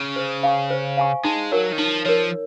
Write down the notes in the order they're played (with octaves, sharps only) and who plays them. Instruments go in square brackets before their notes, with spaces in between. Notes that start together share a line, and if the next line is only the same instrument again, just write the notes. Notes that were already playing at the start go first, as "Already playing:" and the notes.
Already playing: [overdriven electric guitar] C#3
[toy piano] C5
F5 G#5 C#6
C5
F5 G#5 C#6
[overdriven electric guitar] G#3 [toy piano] D#4
[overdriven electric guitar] F#3 [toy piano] A#4 C#5
[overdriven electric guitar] D#3
[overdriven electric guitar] F3 [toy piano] D#4
[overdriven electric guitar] F3 [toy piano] A#4 C#5